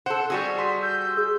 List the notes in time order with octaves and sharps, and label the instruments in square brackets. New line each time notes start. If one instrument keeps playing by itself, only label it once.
[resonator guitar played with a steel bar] A4 C5 [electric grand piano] F#5
[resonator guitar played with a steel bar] G3 F#4 G#4
[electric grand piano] C6 [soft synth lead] B6
[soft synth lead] E6 [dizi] G6
[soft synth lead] G#4